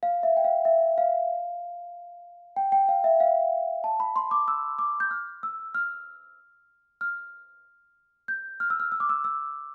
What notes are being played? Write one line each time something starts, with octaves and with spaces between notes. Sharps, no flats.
F5
E5
G5
F5
E5
F5
G5
G5
F5
E5
F5
A5
B5
C6
D6
E6
D6
G6
F6
E6
F6
F6
G6
F6
E6
F6
E6
D6
E6
E6